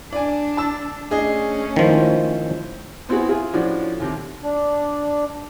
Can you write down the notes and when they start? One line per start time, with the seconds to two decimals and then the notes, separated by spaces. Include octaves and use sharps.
0.13 D4 D5 G#5
0.57 A5 E6
1.11 A3 C#4 D4 G#4 D#5
1.76 D#3 F3 E4 C5
3.09 B3 C4 E4 F#4 G#4
3.29 F4 G#4
3.53 A2 F3 C#4 D4 F#4
4.00 D#2 C3
4.43 D4